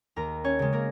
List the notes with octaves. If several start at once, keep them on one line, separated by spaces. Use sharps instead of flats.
D#2 A#4 A#5
C#4 C#5
C#3 G#3
A#3 A#4